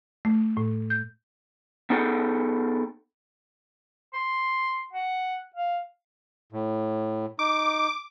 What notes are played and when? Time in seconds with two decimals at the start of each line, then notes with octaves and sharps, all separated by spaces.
0.25 A3
0.57 A2
0.90 G6
1.90 B3 D#4 G#4 A4 F#5 G5
4.14 C6
4.93 F#5
5.56 F5
6.53 A2
7.39 D#4 D6